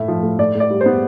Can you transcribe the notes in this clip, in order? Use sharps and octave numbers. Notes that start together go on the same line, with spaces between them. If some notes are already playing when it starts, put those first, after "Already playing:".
Already playing: A2 A3 E5
F3
A2
A2 D5
A2
D5
G3
C5
B3